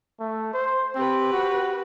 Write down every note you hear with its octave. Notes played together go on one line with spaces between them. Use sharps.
A3
C5
C4 G4 B4
F#4